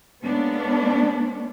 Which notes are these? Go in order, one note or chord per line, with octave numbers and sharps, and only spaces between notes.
G#3 A#3 B3 C#4 D4